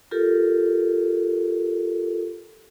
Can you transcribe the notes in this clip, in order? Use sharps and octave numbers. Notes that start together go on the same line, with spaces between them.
F4 G4 A4 A#4